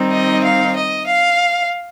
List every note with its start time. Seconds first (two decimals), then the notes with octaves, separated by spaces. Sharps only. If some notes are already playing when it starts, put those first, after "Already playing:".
Already playing: D#3 G3 C4 D#4
0.10 D#5
0.43 F5
0.75 D#5
1.06 F5